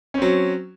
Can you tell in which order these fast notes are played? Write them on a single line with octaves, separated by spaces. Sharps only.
C#4 C4 F#3